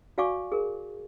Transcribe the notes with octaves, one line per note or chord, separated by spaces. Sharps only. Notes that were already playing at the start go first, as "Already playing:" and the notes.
F#4 D5 F5 G#5 C#6 D6
G#4 A#4